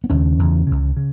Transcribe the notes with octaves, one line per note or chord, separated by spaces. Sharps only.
B3
D#2 C#3 C#4
E2 C#3
C#2 C#3
C#3